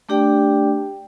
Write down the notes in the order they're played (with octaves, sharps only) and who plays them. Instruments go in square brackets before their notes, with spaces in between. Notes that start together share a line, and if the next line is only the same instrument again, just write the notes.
[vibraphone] A3 D4 G4 D5 G5